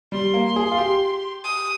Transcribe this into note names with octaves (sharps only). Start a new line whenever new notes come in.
G3 C6
A#3
G#4
F4
G4
D#6